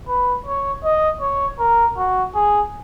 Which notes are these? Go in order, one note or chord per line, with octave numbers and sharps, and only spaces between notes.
B4
C#5
D#5
C#5
A#4
F#4
G#4